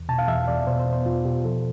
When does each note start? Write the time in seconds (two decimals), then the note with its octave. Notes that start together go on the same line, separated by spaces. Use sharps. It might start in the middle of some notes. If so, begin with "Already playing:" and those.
Already playing: E2
0.09 B2 A5
0.18 F5
0.28 E2 E5
0.48 E2 D5
0.67 B2 C5
0.80 C5
0.86 B3
0.93 C5
1.05 E2 F4
1.25 B2 G4
1.44 F3 A4